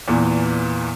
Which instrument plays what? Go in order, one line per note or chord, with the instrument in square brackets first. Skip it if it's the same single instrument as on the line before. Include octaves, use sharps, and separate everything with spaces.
[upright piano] E2 A#2 E3